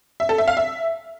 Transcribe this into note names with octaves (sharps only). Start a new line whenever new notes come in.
E5
A4
E5
F5
E5